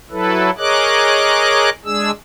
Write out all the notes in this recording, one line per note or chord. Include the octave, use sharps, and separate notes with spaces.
F#3 E4 A4 B4
G#4 A#4 C#5 D#5 D6 F#6
G#3 D4 G#4 E6